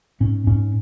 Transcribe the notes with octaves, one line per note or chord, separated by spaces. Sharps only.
G#2 C#4
G#2 C#4